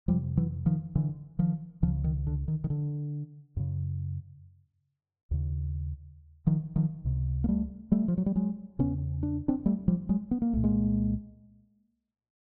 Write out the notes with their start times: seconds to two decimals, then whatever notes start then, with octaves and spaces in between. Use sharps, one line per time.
0.08 F2 F3 G3
0.13 C3
0.37 E3 F#3
0.66 D#3 F3
0.95 D3 E3
1.39 D#3 F3
1.82 C#2 D#3 F3
1.86 C#3
2.04 D#3
2.27 D3
2.48 D#3
2.64 D#3
2.70 D3
3.57 F#2 C#3
5.31 D#2 C#3
6.47 D#3 F3
6.76 D#3 F3
7.05 C#2 C3
7.44 A#3
7.48 G3 A3
7.92 G3 A3
8.08 F3
8.18 F#3
8.26 G3
8.35 F#3 G#3
8.79 E2 C#3 B3 C#4
9.23 D4
9.48 C4 D4
9.66 G3 A3
9.88 F3 G3
10.09 F#3 G#3
10.31 B3
10.42 A#3
10.53 C2 A#2 A3
10.64 G#3 A#3